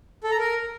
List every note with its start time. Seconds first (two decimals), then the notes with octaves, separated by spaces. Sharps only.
0.24 A4
0.31 A#5
0.39 A#4